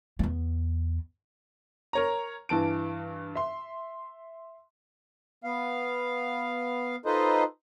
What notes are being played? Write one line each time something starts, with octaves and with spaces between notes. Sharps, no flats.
E2 B3
A#4 C#5 A#5
G2 E3 A5 D7
E5 C6
B3 F5
D#4 F4 A4 B4 C5 D#5